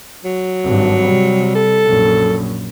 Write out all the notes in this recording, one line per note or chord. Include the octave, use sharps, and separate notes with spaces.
F#3
G#1 G2
C3 G3
A4
A#1 F#2